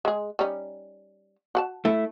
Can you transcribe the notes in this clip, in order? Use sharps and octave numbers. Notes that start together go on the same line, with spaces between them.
G#3 G#4
G3 C#4 D#4
F#4 F#5 A5
A3 E4